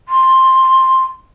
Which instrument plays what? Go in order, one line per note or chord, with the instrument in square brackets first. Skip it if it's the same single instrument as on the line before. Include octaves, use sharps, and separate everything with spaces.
[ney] C6